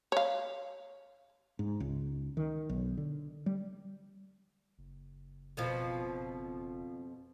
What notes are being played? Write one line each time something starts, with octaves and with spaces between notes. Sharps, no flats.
C#5 F5
G#2
C#2
D#3
B1
D3
G3
F#1
F2 B2 F3